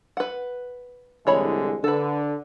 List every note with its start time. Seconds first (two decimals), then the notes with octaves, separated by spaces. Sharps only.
0.17 B4 F#5
1.27 C2 D3 E3 G#3 C#5 B5
1.84 D3 A4 B4